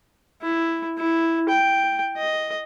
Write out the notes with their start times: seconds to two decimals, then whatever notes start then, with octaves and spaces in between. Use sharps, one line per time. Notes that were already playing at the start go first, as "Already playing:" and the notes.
0.42 E4
0.98 E4
1.49 G5
2.17 D#5